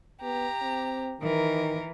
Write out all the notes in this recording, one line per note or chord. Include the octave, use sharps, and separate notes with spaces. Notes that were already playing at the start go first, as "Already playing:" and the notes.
B3 G4 A#5
C4
D#3 E3 A#4